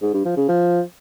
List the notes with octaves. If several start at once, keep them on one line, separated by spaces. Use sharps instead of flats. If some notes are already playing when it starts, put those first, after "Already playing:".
G#2
G2
F3
C#3
F3